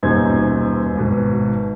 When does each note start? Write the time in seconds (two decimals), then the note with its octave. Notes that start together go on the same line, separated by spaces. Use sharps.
0.03 D#1 F#2 B2 D#4 C5 G#6
0.95 G#1 B2